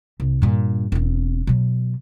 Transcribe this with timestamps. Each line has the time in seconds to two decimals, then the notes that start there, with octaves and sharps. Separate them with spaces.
0.20 C2
0.42 G2 A#2
0.92 E1 C4
1.47 B2 F#3